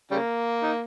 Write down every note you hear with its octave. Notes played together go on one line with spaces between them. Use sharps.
C#3 G3 A#3
D#4